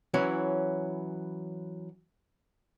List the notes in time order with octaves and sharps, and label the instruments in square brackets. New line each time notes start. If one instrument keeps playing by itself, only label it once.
[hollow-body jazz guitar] E3 F#3 C#4 E4